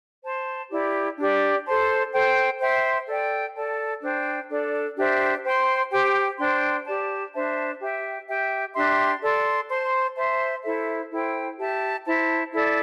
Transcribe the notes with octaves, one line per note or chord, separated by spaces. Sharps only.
C5 A5 C6
E4 G4 D5
D4 G4 D5
A4 C5 A5 C6
A4 C5 G5
C5 E5 G5 C6
A4 D5 G5
A4 D5 A5
D4 C5 G5
D4 A4 D5
D4 G4 C5 E5
C5 G5 C6
G4 C5 G5
D4 C5 G5 C6
G4 D5 A5
D4 C5 E5 A5
G4 E5 G5
G4 E5 G5
D4 G4 E5 C6
A4 D5 C6
C5 A5 C6
C5 E5 A5 C6
E4 A4 C5 E5
E4 A4 C5 G5
G4 E5 A5
E4 C5 A5
E4 A4 D5